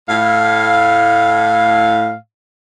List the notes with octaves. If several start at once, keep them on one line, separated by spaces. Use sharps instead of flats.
A2 F5